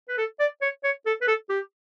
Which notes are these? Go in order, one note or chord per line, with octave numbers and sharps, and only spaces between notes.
B4
A4
D5
C#5
C#5
A4
B4
A4
G4